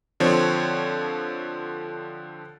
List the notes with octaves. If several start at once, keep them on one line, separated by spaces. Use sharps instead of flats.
D3 F3 C4 C#5